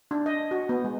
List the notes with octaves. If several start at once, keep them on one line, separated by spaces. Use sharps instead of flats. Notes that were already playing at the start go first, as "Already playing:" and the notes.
D4
D#5
F#4
B3
G#3